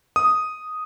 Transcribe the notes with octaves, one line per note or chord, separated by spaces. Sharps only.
D#6